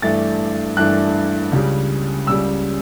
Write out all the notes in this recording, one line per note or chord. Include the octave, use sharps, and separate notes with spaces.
G2 E3 A3 D4 A6
G2 E3 A3 D4 F#6
C#2 C#3 G3
C#2 C#3 G3 E6